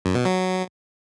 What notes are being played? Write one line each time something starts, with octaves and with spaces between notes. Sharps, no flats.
F#2
B2
F#3